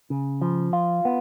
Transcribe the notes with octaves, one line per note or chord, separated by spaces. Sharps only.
C#3
F3
F4
B3